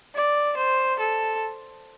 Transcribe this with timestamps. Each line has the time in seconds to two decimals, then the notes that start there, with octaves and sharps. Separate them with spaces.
0.15 D5
0.57 C5
1.00 A4